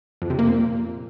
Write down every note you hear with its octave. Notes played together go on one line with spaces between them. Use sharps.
F2
C3
A#3
A#2